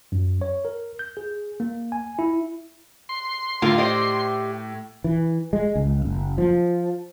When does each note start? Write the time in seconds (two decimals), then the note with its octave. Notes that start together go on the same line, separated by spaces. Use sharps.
0.12 F#2
0.41 C#5
0.65 A#4
0.99 G6
1.17 G#4
1.60 A#3
1.92 G#5
2.19 E4
3.09 C6
3.62 A2 D3 F4 A#4
3.78 G4 C5 D5 D#5
5.04 E3
5.53 G#3
5.75 C#2
6.05 F#1
6.38 F3